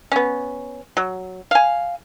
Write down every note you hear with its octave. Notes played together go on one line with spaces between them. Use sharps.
B3 C#4
F#3
F5 G#5